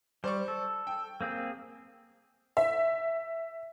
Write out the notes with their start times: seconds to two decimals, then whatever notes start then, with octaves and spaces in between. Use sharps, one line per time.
0.24 G3 C5 D5 C#6
0.48 A4
0.87 G5
1.21 A#3 C4 G#4
2.57 E5